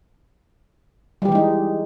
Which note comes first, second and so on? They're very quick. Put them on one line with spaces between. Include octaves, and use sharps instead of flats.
G3 G4 E3 G#3 D#4